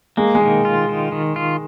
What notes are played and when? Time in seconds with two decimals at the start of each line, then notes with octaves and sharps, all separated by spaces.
0.17 G#3 A#3
0.35 G#3
0.41 D#3
0.65 F4
0.89 D#3
1.12 D#3
1.36 F4